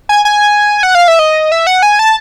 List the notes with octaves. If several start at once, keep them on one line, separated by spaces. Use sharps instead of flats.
G#5
G#5
F#5
F5
E5
D#5
E5
F#5
G#5
A5